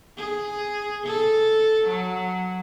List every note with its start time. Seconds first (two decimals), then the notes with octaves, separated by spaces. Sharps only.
0.17 G#4
1.07 A4
1.88 F#3